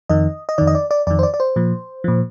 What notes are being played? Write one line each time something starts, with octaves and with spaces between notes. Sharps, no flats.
F2 D#3 D#5
D#5
F2 D#3 D5
D#5
D5
D5
F2 D#3 D5
C5
D5
D5
C5
A#2 F3
A#2 F3